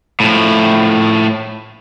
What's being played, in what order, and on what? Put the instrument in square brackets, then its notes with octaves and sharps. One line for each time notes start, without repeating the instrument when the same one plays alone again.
[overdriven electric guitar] A2 F3